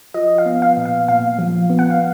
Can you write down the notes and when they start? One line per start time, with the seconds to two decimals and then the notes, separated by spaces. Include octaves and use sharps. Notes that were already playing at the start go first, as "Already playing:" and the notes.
0.14 F3 D#5
0.38 F5
0.46 B3
0.62 F5
0.77 A#2
0.86 F5
1.08 A#2 F5
1.39 F3
1.70 B3
1.79 F#5
1.90 F5